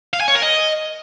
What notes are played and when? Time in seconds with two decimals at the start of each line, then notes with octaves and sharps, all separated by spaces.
0.13 F5
0.21 G#5
0.28 C#5
0.35 A#4
0.42 D#5